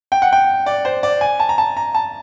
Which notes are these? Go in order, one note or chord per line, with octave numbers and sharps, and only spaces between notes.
G5
F#5
G5
D5
C5
D5
G#5
A5
A#5
A5
A#5
A5